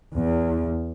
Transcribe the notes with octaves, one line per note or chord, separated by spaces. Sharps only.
E2